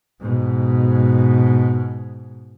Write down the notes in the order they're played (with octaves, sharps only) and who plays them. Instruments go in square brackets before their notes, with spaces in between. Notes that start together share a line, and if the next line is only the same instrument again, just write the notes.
[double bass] G#2 B2